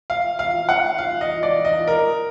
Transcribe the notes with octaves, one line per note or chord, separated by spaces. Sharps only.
F5
F5
F#5
F5
D#5
D5
D#5
A#4